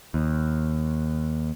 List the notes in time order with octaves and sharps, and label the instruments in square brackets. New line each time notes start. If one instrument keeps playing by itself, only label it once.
[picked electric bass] D#2